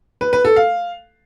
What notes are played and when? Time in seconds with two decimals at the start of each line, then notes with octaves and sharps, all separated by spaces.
0.21 B4
0.33 B4
0.45 A4
0.56 F5